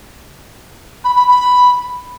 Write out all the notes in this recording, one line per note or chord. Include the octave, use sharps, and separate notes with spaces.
B5
B5
B5